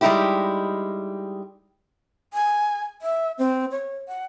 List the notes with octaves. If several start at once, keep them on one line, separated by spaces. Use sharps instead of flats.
G3 G#3 C4 D#4 E4 G4
G#5
E5
C4
C#5
F#5